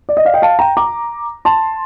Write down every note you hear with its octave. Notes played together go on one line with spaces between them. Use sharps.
D5
D#5
D5 F5
D#5 G5
F5 A5
G5 A#5
A#5 D6
A5 C6